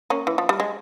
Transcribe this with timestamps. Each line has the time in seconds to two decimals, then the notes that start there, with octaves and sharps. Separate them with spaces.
0.10 A#3 C#4
0.27 E3
0.38 F3
0.49 G3
0.60 G#3